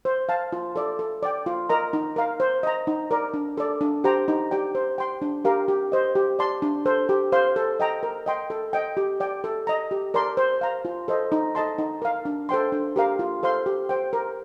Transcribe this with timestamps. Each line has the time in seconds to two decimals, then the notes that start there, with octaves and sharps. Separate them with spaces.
0.05 C5
0.29 F5 A5
0.53 F4
0.76 A4 D5
0.99 A4
1.23 D5 G5
1.46 F4
1.69 A#4 D#5 A#5
1.93 D#4
2.16 A#4 F5
2.40 C5
2.63 D#5 A#5
2.87 D#4
3.11 A#4 D5
3.34 D4
3.57 A4 D5
3.81 D4
4.04 G4 C5 G5 A#5
4.28 D#4
4.51 G4 D5 G5
4.75 C5
4.98 G5 C6
5.22 D4
5.45 G4 A#4 F5
5.68 G4
5.92 C5 D#5
6.15 G4
6.39 D5 A5 C6
6.62 D4
6.86 A4 C5
7.09 G4
7.32 C5 F5 C6
7.56 A4
7.80 D#5 G5 A#5
8.03 A#4
8.26 D#5 G5 C6
8.50 A4
8.73 D#5 G5
8.97 G4
9.20 D5 G5
9.44 A4
9.67 D#5 A#5
9.91 G4
10.14 A#4 D5 A5 C6
10.37 C5
10.61 F5 A#5
10.85 F4
11.08 A4 C5 D#5
11.32 D#4
11.55 A4 D#5 A5 C6
11.78 D#4
12.02 A#4 F5
12.25 D4
12.49 A4 C5 G5 C6
12.72 D4
12.96 G4 A#4 F5
13.19 F4
13.43 A4 C5 F5 C6
13.66 G4
13.89 C5 G5
14.13 A#4